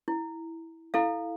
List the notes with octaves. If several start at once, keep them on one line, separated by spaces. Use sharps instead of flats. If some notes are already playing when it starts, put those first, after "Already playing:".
E4
E4 A4 F5